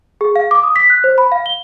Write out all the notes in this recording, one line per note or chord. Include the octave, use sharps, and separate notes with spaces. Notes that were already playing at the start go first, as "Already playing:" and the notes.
G#4
F5
D6
D#6
B6
F#6
C5
B5
F5
G7